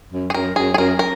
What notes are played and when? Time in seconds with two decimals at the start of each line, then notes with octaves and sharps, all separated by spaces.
0.13 F#2
0.30 G#4
0.34 F#2 A#4
0.56 F#2 G#4
0.74 G#4
0.78 F#2 A#4
0.99 A#4